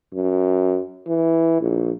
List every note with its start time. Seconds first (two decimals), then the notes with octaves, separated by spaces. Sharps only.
0.14 F#2
1.07 E3
1.61 A#1